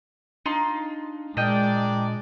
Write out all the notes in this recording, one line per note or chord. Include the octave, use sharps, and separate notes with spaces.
D4 D#4 F4 C6
A#2 G#3 D4 A#4 D5 D#5 G5